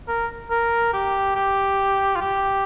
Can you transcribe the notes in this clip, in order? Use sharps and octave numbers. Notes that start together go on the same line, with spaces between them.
A#4
A#4
G4
G4
F4
G4